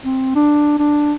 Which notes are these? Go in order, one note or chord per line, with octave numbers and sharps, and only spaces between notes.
C4
D4
D4